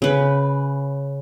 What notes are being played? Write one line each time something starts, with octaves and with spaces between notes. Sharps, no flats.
C#3 B4